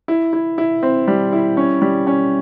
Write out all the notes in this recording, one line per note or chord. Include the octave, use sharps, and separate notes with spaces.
E4
E4
E4
C4
G3
E4
C#4
G3
C#4